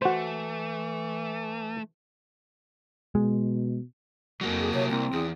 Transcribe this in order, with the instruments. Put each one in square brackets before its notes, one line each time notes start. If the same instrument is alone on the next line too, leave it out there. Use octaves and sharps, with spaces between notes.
[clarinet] E3 [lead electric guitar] A3 [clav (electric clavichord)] F#4 C5
[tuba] B2 [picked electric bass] G#3
[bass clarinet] F2 [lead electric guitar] F#3 A#3
[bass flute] G#4
[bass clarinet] C3 [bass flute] C#5
[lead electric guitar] C2 [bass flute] A#3 [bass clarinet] C4
[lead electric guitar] E2 [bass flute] G#4